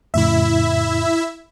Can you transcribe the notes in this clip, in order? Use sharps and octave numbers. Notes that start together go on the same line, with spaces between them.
F2 A2 C#3 E4 E5